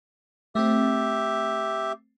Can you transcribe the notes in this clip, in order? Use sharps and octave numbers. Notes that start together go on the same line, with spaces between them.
A3 C4 G4 E5